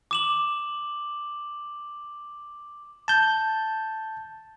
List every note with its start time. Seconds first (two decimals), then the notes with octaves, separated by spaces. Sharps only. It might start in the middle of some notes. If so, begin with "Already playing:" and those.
0.11 D6 E7 F#7
3.08 A5 G6